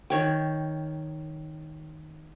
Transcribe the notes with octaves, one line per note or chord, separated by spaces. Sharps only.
D#3 C#5 G5